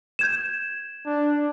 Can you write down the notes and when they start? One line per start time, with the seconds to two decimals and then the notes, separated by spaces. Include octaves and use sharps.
0.19 G6 G#6 E7
1.06 D4